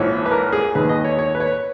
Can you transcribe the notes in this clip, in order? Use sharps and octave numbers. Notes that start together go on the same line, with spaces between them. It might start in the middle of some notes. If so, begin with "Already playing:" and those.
Already playing: A#1 G#2 E3 C#5
B4
A#4
G#4
D#2 D#3 B4
D#5
C#5
C#5
B4
C#5